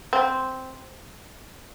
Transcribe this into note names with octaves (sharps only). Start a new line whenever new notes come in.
C4